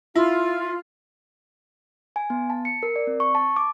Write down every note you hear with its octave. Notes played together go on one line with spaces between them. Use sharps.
E4 F4
G#5
B3
A5
C#7
A#4
D5
C4
C#6
A5
D6